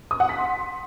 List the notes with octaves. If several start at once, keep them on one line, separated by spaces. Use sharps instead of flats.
D#6
F#5
B6
C6